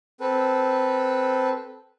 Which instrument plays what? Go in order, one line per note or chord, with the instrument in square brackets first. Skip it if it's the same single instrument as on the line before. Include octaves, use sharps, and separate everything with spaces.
[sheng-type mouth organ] C4 A4 B4